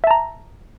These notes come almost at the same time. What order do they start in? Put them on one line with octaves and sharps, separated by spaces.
E5 A5 A#5